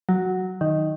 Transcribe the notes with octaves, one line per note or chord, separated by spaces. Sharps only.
F#3
D#3